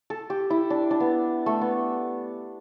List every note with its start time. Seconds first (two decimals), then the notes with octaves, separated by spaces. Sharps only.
0.10 A4
0.30 G4
0.50 E4
0.70 D4
0.91 D4
1.00 B3
1.46 A3
1.61 B3